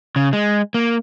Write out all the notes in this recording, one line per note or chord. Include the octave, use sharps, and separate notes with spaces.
C#3
G#3
A#3